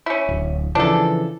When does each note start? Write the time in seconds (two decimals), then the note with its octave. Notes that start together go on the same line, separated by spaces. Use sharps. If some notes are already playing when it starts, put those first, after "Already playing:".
0.06 C#4 E4
0.29 D1
0.75 C#3 E3 F3 D4 A4